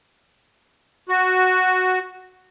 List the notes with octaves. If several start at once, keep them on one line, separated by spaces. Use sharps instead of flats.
F#4